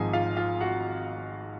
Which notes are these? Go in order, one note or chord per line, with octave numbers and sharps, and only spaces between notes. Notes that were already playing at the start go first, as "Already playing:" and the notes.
Already playing: G#1 G#2 F3 G#4 G#5
F4 F5
F4 F5
F#4 F#5